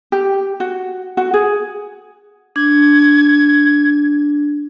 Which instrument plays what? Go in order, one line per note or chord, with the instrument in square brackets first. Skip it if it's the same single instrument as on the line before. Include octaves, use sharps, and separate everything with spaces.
[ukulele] G4
F#4
F#4
G#4
[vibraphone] D4 [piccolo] G#6